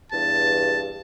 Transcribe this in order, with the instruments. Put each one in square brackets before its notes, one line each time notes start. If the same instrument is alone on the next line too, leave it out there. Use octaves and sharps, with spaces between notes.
[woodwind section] E2 G2 [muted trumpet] A5